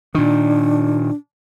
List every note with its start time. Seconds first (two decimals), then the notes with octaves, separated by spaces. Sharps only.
0.15 A#2 D#3 D4